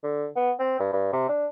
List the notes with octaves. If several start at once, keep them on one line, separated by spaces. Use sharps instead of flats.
D3
B3
C4
G2
G2
C3
D4